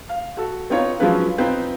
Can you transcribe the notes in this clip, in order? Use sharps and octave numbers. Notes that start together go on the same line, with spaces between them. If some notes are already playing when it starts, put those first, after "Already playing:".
F5
F#4 A4
B3 C4 D#4 F4 C#5
F3 F#3 G#3 C#4 F4 B4
C4 D#4 F4 B4 C5